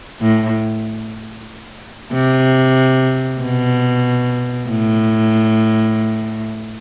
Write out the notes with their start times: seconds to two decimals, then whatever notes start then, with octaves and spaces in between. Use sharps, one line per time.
0.21 A2
2.13 C3
3.41 B2
4.69 A2